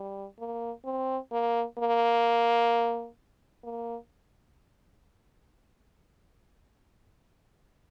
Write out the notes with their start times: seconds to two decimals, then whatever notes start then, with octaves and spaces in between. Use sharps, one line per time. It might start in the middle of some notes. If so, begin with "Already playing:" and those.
Already playing: G3
0.39 A#3
0.85 C4
1.32 A#3
1.78 A#3
3.64 A#3